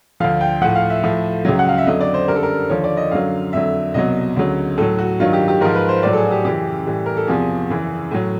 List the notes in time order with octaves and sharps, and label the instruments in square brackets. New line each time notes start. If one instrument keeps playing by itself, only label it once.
[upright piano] D2 D3 F3 F5
G5
A2 F3 F#5
F5
E5
A2 F3
C#2 C#3 F#3
F#5
F5
E5
F2 D3 F#3 D#5
D5
C5
F#2 D3 G3 A#4
A4
A#4
D#2 D3 F3 C#5
D5
D#5
F#2 D3 F#3 F5
F2 D3 F#3 E5
C2 B2 F#3 D#5
D2 C#3 F#3
A2 F#3 A4
F#4
G2 D#3 F#3 F4
G4
G4
G#2 F3 A#4
B4
C5
A2 F#3 D5
A4
G#4
F#4
G4
F#2 C#3 E3 G4
A2 E3 G3
A#4
A4
E2 C3 F3 G#4
F#2 C#3 E3
A2 F#3